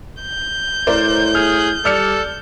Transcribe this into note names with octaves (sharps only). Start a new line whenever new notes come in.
G6
A2 A#4 C5 D5
G#4 F6
G3 A4 D5 F6 C#7